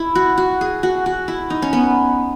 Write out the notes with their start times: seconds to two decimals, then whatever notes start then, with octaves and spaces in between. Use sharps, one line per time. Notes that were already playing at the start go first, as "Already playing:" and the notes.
Already playing: E4
0.15 F#4
0.38 F#4
0.61 G#4
0.83 F#4
1.06 F#4
1.28 E4
1.50 D#4
1.62 C#4
1.73 B3